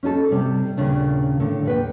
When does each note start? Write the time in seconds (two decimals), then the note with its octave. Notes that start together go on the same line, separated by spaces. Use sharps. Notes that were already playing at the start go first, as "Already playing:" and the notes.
0.03 C#4 D#4 G#4 A4
0.31 C3 G3
0.77 D#2 A#2 C#3 D4
1.40 A2 D3
1.65 D#2 B4 G5